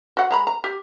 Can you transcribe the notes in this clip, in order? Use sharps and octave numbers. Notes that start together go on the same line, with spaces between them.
F#4 F#5
G#3 A#5 B5
A#5
G4